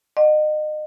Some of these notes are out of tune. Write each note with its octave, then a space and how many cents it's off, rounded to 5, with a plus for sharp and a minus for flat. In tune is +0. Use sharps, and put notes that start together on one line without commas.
D#5 -30 F#5 +0